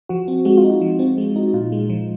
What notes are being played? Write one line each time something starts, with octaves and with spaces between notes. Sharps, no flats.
F3 F#4
C4
G#3 F#4
F4
D#4
F#4
F3
C4
G#3
D#4
A#2 F4
G#3
F3